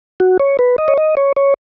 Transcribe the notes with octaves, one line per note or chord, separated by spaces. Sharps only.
F#4
C#5
B4
D#5
C#5
D#5
C#5
C#5